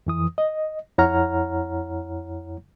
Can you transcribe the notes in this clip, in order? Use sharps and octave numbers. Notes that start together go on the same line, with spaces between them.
F2 E3 D#6
D#5
F2 E4 C#5 F#5 A#5 F6